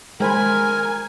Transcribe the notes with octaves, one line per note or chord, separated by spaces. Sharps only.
G#3 A#4 C5 G#5 B5